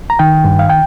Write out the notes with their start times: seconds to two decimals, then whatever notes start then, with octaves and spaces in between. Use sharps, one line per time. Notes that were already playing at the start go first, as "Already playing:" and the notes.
0.10 A#5
0.19 D#3 G5
0.44 G2
0.59 F5
0.70 G5